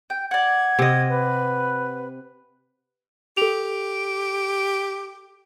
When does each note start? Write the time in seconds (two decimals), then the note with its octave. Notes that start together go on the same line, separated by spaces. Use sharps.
0.10 G5
0.31 D5 F#5 G#6
0.79 C3 D#5
1.09 B4
3.37 G4 A4 F7